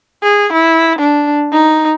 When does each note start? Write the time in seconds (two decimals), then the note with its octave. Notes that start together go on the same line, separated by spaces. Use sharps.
0.23 G#4
0.53 E4
0.99 D4
1.52 D#4